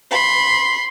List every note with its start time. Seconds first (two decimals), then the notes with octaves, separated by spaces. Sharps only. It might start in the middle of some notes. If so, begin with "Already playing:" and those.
0.11 B5 C6